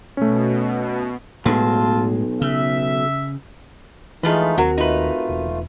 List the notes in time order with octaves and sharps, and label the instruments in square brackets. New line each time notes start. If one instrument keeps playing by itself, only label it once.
[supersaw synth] B2 [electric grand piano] A3 C#4
[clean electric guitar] B1 [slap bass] A2 G#3 [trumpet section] C4 F4 A5
[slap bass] C#3 [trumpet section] E5
[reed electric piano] E3 G#4 [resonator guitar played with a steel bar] F3 F4 B4 [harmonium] G#3 A3 D#4
[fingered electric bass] D#2 [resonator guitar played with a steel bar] F#3 [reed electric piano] C4 F#4 A#4
[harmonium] A3 F4 [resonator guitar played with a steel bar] D#4 B4
[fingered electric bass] E1